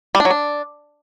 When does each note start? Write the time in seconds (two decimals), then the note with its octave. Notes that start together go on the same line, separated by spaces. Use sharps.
0.15 G3
0.20 D4
0.25 F#3
0.30 D4